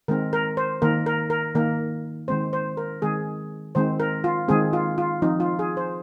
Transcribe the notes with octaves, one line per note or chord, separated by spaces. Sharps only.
D#3 G#3 C4 A#4
A#4
C5
D#3 A#3 A#4
A#4
A#4
D#3 A#3 A#4
D#3 G#3 C4 C5
C5
A#4
D#3 G#3 C4 G#4
D#3 G#3 C4 C5
A#4
F4
D#3 G#3 C4 G#4
F4
F4
F3 C4 D#4
F4
G#4
C5